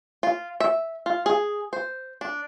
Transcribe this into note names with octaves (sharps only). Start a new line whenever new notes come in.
F4
E5
F4
G#4
C5
D4